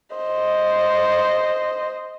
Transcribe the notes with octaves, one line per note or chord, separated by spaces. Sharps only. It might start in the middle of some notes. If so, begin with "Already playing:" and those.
C5 D#5